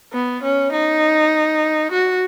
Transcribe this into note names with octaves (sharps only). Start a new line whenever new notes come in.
B3
C#4
D#4
F#4